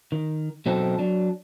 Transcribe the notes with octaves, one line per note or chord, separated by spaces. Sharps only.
D#3
B2 F#3 C4 D#4 A4
F#3 D4